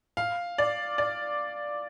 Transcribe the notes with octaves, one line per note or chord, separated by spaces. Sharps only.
F5
D5
D5